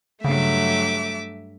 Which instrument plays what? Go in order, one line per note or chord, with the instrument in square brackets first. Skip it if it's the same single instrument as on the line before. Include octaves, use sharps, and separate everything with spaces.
[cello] G2 F#3 [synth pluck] C#3 [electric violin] A3 [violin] E5 D6